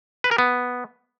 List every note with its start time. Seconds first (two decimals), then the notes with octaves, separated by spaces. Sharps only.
0.24 B4
0.31 A#4
0.38 B3